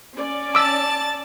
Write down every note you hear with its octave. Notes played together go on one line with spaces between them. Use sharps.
C#4 D5
A5 D6 E6 A6